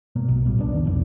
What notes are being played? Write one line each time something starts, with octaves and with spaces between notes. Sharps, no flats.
G#2 B2 A#3
B1 B2
D#1 A1 A#2 G3
C2 A#3 B3 D4
E2 D3 D#3 D4
F#1 B1 F2 E3